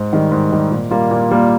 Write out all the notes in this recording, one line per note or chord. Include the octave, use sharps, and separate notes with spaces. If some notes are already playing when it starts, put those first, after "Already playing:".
Already playing: G#2
D#3 G3
G#2
D#3 G3
A#2
G3 A#3 F4
A#2
G3 A#3 F4